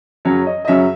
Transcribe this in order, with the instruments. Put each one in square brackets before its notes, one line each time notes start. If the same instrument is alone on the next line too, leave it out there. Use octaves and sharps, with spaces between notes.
[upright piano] F#2 C#3 F#3 C#4 C#5
D#5
D#5
F#2 C#3 F#3 C#4 E5